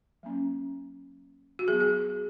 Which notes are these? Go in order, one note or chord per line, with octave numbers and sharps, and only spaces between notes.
F#3 A#3 C#4
F#4
F#3 B3 G#4
G#4